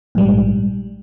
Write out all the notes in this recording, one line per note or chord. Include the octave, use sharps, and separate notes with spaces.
A#1 G#2 G3